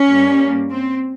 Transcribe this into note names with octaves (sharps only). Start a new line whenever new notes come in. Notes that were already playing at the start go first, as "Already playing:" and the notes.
Already playing: C#4
G2 G3 A#3
C4